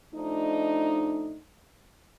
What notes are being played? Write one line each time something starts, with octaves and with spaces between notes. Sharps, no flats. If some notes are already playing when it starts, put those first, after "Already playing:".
F3 A3 D4 D#4